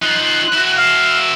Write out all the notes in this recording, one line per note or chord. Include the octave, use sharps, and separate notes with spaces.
D#4 F4 F#6
E4 F#4
F5